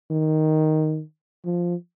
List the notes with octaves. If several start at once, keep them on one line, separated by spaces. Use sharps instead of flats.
D#3
F3